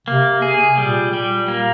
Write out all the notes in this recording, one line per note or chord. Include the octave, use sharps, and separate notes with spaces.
C3 A#3
G#4
A#2 G3
G3
A#3